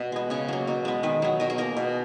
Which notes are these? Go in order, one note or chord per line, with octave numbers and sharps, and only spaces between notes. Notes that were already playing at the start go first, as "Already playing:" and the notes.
Already playing: B2
G#3 B3
C#3 C#5
F#3 A#3
B2
G#3 B3
D#3 B4
F#3 B3
B2 A#4
G#4
A#3 A#4
B2